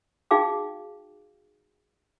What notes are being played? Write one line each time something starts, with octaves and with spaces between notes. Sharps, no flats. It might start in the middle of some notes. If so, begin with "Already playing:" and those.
D#4 F#4 G#4 F5 G5 D6